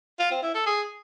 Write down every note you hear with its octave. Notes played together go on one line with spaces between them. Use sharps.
F4
C4
E4
A4
G#4